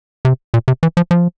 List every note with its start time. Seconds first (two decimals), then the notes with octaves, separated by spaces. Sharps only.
0.25 C3
0.54 A#2
0.68 C3
0.83 E3
0.97 F3
1.11 F3